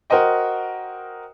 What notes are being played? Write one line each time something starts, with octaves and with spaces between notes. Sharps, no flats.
F#4 A#4 C5 D#5 G5